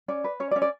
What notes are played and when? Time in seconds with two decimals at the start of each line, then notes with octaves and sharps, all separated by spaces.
0.08 C#4 D5
0.24 B4
0.40 C#4 C#5
0.51 D5
0.56 C#4
0.62 D5